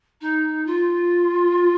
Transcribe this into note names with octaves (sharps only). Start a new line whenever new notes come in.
D#4
F4